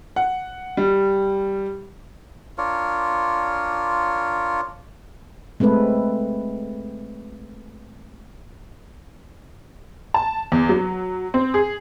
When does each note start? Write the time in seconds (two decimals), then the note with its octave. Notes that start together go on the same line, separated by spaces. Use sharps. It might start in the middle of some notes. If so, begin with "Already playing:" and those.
0.16 F#5
0.77 G3
2.58 D4 F4 A#4 C#5
5.60 G#3 A3 C4 A4 B4
10.14 A5
10.52 E2
10.69 F#3
11.34 C4
11.54 G#4